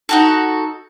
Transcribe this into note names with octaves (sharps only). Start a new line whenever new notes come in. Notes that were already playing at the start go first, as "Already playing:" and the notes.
D#4 F#4 A4